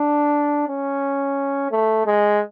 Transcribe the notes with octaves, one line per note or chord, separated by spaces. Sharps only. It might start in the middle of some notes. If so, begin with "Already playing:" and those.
Already playing: D4
C#4
A3
G#3